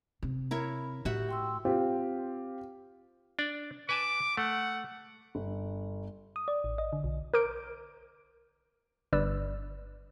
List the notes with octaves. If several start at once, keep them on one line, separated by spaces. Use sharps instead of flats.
C3
E4 A#4 C#5 B5
A2 F#4 G4 E5 F#5
G5 C6 E6
C4 F4 G4
D4 D5
B4 G#5 A5 D6
A3 F#5
G1
D#6
D5
A1
D#5
D3
B1
A#4 C5 D6 G6 D7
G1 G2 B4 D5 E6